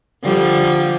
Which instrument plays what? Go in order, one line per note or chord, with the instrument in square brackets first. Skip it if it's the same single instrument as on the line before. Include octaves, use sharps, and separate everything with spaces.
[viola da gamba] D3 F3 G3